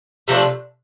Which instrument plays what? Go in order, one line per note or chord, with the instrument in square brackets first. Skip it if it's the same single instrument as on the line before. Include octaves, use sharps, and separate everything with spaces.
[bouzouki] C3 F3 A3 D4